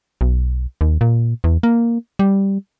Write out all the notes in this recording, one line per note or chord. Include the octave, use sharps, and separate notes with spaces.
B1
D#2
A#2
E2
A#3
G3